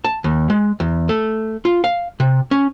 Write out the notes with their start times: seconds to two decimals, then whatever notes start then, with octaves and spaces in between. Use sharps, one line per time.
0.04 A5
0.24 D#2
0.50 G#3
0.80 E2
1.09 A3
1.65 F4
1.84 F5
2.20 C3
2.51 C#4